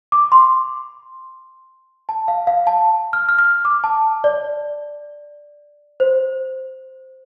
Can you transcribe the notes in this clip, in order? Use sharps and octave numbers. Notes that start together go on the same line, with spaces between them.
D6
C6
A5
F5
F5
A5
F6
F6
F6
D6
A5
D5
C5